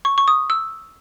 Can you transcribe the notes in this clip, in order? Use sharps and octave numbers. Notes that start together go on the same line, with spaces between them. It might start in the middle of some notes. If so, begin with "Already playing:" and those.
C#6
C#6
D#6
E6